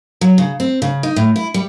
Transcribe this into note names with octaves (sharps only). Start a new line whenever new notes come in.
F#3
C#3
C4
C#3
D#4
A2
E4
G3